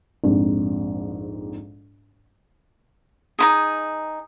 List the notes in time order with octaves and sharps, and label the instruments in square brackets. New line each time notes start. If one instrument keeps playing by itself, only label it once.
[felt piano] A#1 F2 G#2
[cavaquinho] D#4 E4 G#4